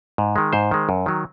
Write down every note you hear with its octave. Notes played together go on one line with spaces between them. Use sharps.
G#2
D#3 G#3
G#2 C5
D#3 G#3
F#2
D#3 F#3